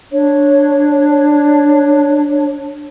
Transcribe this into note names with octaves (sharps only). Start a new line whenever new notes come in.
D4 C#5